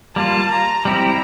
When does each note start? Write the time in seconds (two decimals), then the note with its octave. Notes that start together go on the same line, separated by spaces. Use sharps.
0.16 G3 A#3 F4 A5
0.50 A#5
0.85 G3 C4 E4 G4 A#5